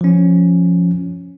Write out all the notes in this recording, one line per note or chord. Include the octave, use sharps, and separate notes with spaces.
F3 C#4